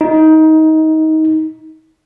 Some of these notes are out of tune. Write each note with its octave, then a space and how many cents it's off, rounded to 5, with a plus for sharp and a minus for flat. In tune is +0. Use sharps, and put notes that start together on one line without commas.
D#4 +20